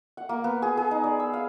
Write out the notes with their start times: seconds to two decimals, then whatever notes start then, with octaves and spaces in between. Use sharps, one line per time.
0.17 F#5
0.29 A#3
0.44 B3
0.62 G#4
0.77 G#4
0.91 D#4
1.04 D5
1.20 E6
1.33 F5